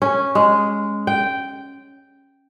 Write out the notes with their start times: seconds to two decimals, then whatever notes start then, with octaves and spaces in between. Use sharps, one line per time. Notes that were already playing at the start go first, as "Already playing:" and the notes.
0.02 C#4
0.35 G#3
1.07 G5